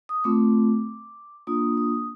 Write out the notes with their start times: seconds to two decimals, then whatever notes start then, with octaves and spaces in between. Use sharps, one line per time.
0.09 D#6
0.24 A3 C4 F4 D6
1.47 A#3 D4 F4 D#6
1.77 D#6